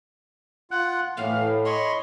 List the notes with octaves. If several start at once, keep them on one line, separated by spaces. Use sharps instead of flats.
F4 F#5 F#6
A2 E3 F5
C#5 D#5 B5 C6